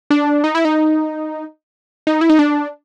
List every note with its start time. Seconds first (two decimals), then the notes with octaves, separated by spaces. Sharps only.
0.10 D4
0.44 D#4
0.55 E4
0.65 D#4
2.07 D#4
2.21 E4
2.30 D#4
2.39 D4